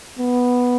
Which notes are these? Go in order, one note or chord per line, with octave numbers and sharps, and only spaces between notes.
B3